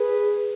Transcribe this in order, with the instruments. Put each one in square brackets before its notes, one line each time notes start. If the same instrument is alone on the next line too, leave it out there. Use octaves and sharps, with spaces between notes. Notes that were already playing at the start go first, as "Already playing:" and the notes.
Already playing: [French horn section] G#4 B4